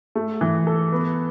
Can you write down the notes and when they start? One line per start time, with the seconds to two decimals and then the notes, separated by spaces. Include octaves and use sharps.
0.15 A3
0.41 E3
0.67 A4
0.92 B3